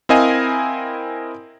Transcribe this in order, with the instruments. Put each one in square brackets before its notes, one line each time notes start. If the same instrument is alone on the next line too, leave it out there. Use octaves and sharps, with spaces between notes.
[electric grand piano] C4 E4 A#4 D#5 F5 G#5